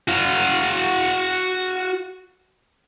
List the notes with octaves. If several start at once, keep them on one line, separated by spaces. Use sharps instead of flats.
F#4 F5